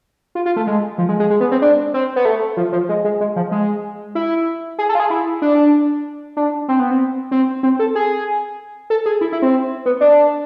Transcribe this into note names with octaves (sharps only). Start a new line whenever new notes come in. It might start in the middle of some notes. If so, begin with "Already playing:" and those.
F4
F4
A3
G#3
F3
G#3
G#3
G#3
B3
C4
D4
C4
B3
A3
F3
F3
G#3
G#3
G#3
F3
G#3
E4
G#4
A4
F4
G#4
E4
D4
D4
C4
B3
C4
C4
C4
A4
G#4
A4
G#4
E4
E4
C4
B3
D4